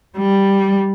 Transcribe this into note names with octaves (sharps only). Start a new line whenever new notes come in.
G3